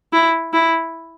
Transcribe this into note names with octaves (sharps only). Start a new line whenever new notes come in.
E4
E4